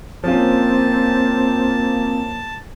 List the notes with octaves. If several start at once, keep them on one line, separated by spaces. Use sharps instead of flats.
F3 A#3 C4 C#4 F4 A5